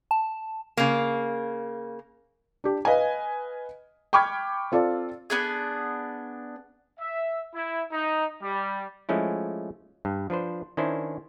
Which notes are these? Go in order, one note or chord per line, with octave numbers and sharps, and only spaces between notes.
A5
C#3 A#3
D4 G4
B4 D#5 F5 G#5
G5 B5 C#6 D6 F6 G#6
C4 F4 A4 D5
B3 D4 G#4
E5
E4
D#4
G3
F3 G#3 A3 C#4 E4
G2
F3 D4 B4 C5
D#3 C#4 D4 E4 C5